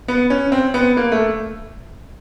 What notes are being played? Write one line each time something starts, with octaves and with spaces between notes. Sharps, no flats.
B3
C#4
C4
B3
A#3
A3